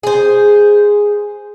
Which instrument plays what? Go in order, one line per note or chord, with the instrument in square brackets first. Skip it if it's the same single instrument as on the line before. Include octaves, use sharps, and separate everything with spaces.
[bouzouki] G#4 C5